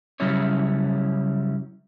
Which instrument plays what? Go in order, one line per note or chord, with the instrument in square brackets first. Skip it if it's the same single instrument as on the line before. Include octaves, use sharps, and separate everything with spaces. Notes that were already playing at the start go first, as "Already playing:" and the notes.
[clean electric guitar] C#3 F#3 G3 C#4 E4 C#5